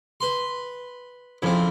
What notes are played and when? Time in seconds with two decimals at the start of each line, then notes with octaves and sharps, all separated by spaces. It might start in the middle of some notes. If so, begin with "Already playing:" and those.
0.21 B4 C6
1.42 A#1 F2 F3 C4 C#4 E4